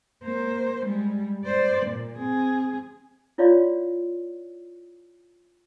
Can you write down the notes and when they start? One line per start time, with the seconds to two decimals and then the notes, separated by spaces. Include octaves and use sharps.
0.24 A#3 C5
0.84 G3 G#3
1.44 C5 D5
1.85 A#2
2.18 C4 G#4
3.38 E4 F4 C#5 D5 F5 C6